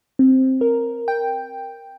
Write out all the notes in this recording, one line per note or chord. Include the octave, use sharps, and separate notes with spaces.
C4
A#4
G5